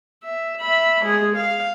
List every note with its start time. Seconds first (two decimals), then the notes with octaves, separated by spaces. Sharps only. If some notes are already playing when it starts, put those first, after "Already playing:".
0.24 E5
0.61 E5 B5
1.04 G#3 G#4
1.36 F5